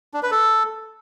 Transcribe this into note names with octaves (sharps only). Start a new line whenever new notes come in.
D4
B4
A4